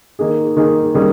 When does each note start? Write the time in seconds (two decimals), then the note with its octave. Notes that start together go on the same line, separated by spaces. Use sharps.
0.19 D#3 A#3 D#4 G#4
0.57 D#3 A#3 D#4 G#4
0.94 D#3 G3 A#3 C#4 G#4